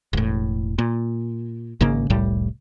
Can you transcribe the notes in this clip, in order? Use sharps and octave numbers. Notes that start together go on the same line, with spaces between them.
E1 A2
A#2
G#1 G#2 C#3 A#3
F1 C2 A2 G3